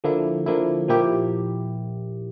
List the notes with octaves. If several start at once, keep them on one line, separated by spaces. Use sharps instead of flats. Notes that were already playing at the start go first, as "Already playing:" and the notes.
D3 F3 A#3 E4
D3 F3 A#3 E4
A#2 F3 A#3 E4 G4